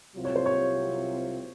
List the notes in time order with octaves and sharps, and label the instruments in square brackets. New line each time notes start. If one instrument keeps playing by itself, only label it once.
[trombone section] C2 C3 F#3 C4 F4
[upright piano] C#5
C5
C#5